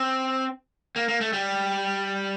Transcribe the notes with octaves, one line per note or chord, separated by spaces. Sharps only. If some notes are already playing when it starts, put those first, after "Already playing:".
Already playing: C4
A#3
A#3
A3
G3